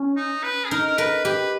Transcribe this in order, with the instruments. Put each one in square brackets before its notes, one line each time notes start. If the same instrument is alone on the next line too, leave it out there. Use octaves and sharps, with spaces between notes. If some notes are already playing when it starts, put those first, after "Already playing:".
Already playing: [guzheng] C#4
[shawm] D#4
B4
G#4
[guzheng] D#4 [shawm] A#4
[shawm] A#4
[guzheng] A#4 [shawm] B4
[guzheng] G4 [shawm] B4